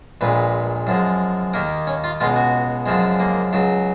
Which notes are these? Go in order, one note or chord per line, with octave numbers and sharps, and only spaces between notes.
A#1 A#2 G#3 B4
F#2 F3 G#3
D#2 D#3 A#3 A#4
C#4
F4
C#2 B2 G#3 F4
F#4
F#2 C#3 F3 G#3
A#3
C#2 C#3 F#3